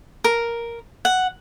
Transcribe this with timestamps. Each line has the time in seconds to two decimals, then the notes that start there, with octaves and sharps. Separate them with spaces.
0.24 A#4
1.05 F#5